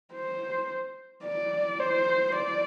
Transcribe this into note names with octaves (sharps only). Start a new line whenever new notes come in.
C5
D5
C5
D5